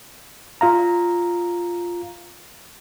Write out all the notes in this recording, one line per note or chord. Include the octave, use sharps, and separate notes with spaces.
F4 F5 A#5